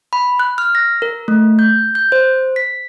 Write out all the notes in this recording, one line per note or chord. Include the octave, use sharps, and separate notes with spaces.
B5
F#6
F6
A#6
A#4
A3
G6
G6
C5
B6